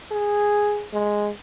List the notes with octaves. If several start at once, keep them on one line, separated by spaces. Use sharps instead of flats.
G#4
G#3